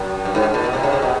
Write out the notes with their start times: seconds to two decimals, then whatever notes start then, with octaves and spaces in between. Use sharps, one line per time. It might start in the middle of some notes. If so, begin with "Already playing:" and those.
Already playing: F#2
0.25 G2
0.35 G#2
0.54 A#2
0.64 B2
0.73 C3
0.83 C#3
0.93 C3
1.02 B2